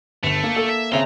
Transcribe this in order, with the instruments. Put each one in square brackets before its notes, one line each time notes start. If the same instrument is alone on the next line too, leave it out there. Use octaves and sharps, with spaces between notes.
[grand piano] G1 F7 [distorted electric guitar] A3
[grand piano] A#3
[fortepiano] A4
[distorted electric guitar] E5
[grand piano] C#3 C4 [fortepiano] E5 [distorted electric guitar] A#5 C6